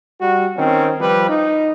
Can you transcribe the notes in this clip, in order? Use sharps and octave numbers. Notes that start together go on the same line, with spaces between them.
G3 F#4
D#3 C4 C#4
F3 G3 B4
D#4